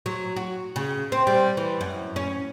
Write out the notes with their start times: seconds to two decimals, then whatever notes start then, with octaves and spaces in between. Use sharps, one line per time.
0.06 F#3
0.36 F#4
0.76 C#3
1.12 C4
1.27 G3
1.57 E3
1.81 F#2
2.16 C#4